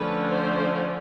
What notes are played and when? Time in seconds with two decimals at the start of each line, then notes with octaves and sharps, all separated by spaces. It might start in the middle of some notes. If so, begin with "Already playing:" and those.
Already playing: D3 F3 A3 C#4 B4
0.30 C5